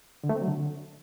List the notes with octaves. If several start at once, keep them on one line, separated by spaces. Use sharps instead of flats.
D3
A3
C4
F#3
D3